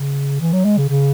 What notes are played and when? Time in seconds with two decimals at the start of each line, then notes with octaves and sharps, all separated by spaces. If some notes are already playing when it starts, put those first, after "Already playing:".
Already playing: C#3
0.41 E3
0.53 F#3
0.65 G#3
0.78 C#3
0.89 C#3